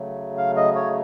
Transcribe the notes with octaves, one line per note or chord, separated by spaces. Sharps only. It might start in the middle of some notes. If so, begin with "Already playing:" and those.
Already playing: C#3 F#3 A3
F5
D#5
C#5